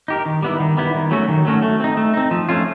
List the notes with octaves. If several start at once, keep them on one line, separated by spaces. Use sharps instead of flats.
D#4 G4 A#4
D#3
G3 B3 E4
D#3
G3 B3 E4
D#3
F#3 A3 C#4 F#4
D#3
F#3 A3 C#4 F#4
A3
C4 D#4
A3
C4 D#4
F3
A3 C#4 F4